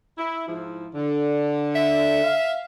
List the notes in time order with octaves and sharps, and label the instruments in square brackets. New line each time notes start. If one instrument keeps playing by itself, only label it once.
[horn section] E4
G#2 F3 E4
D3
[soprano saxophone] E5
[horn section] F5